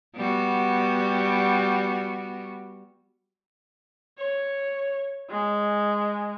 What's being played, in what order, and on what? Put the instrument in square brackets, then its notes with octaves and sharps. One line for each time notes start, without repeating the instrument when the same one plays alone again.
[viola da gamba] G3 B3 F#4
[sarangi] C#5
G#3